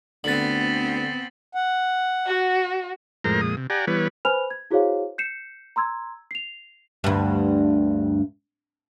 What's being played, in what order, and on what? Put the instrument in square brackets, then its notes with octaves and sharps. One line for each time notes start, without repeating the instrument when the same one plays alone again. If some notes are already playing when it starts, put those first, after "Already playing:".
[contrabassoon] D2 [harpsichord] D3 B4 [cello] B3 C4 [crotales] A6 F#7
[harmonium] F#5
[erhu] F#4
[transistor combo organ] F2 A2 G#3 A#4 C5 A#5
F2 A#2 G#3 D#6
C3
G4 D5 F#5 G#5 A#5
E3 G3 B3 B4 C#5
[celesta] B4 C5 G#5 B5 F6 F7
G#6
E4 F#4 G#4 C5 C#5 F5
G6 C7 C#7 E7
A#5 C6 E6 G#6
C7 F7
[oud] D2 G2